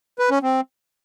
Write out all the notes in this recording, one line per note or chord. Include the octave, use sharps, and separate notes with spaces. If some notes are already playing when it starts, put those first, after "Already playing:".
B4
C#4
C4